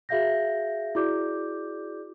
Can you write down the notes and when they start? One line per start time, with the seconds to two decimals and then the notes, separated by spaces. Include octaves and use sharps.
0.09 F#4 G#4 E5 F5 G6 A#6
0.95 E4 F#4 G#4 D5 D6 G6